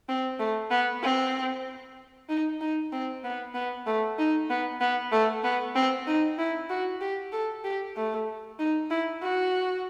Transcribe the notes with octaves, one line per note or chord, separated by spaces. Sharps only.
C4
A3
B3
C4
D#4
D#4
C4
B3
B3
A3
D#4
B3
B3
A3
B3
C4
D#4
E4
F#4
G4
A4
G4
A3
D#4
E4
F#4